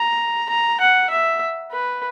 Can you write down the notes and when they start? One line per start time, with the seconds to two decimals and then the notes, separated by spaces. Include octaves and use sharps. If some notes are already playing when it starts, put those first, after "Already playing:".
Already playing: A#5
0.49 A#5
0.80 F#5
1.10 E5
1.72 B4